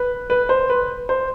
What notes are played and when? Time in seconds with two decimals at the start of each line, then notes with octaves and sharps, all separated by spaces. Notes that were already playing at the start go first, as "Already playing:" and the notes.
Already playing: B4
0.30 B4
0.49 C5
0.70 B4
1.09 C5